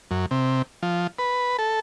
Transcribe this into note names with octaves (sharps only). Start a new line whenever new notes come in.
F#2
C3
F3
B4
A4